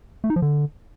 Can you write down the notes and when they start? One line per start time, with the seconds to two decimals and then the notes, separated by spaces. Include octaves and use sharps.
0.24 A3
0.30 D#4
0.36 F3
0.42 D3